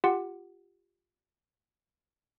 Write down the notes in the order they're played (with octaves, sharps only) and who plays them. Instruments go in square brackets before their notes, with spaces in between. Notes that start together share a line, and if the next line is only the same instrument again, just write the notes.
[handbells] F4 G4 F#5